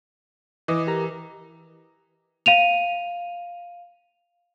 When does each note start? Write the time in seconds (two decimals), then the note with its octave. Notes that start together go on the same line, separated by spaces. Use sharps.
0.68 E3 D#5 D6 D#6
0.87 G4 A#4 A#5
2.46 F5 D#7 F7